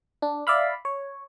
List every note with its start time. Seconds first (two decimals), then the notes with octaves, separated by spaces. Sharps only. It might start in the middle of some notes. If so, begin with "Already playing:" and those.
0.22 D4
0.47 D5 E5 F5 B5
0.85 C#5